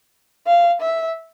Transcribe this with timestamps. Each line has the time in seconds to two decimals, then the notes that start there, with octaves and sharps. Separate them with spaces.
0.46 F5
0.81 E5